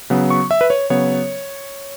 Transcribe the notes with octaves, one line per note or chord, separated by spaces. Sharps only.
C#3 F#3 B3
C#6
E5
B4
C#5
C#3 F#3 B3 C#5